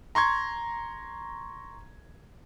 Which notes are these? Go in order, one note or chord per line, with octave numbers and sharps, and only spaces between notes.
A#5 C6 C#6 G#6